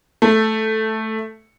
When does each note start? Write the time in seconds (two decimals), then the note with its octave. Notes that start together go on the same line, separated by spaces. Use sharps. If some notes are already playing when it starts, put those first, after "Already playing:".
0.22 A3